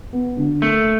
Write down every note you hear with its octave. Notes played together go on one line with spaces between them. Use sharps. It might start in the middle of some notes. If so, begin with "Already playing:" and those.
B3
D3
A3 A#3